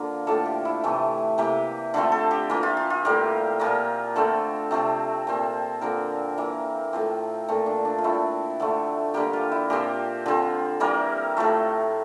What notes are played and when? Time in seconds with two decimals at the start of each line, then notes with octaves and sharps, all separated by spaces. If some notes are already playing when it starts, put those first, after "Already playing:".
Already playing: D3 F3 A#3
0.27 A2 F3 A#3 A4
0.46 G4
0.65 E4
0.84 C3 E3 A3
1.38 C3 E3 A#3 G4
1.94 D3 F3 A3 C4 A4
2.12 A4
2.31 G4
2.50 E3 A#3 F4
2.63 F4
2.77 F4
2.90 F4
3.05 A2 G3 A#3 G4
3.60 A#2 F3 A#3
4.16 D3 A3 C4 A4
4.71 C3 F3 A3 C4
5.27 A#2 F3 C4
5.81 D3 F3 A#3 A#4
6.38 E3 A#3
6.93 A2 F3 C4
7.48 A#2 A3 C4 A4
7.66 D4
7.85 D4
7.98 F4
8.04 A#2 A3 C4 E4
8.60 D3 F3 A3
9.14 D3 G3 A#3 G4
9.33 F4
9.52 E4
9.70 A#2 F3 C4 G4
10.26 D3 F3 C4
10.80 E3 G3 A#3 A#4
11.37 A2 F3 A3